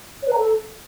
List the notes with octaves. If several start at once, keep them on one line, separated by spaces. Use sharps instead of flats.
C#5
B4
A#5
A4